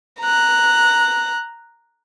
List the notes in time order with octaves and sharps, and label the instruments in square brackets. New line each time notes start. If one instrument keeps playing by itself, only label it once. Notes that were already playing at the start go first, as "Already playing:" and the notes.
[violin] A#5 F#6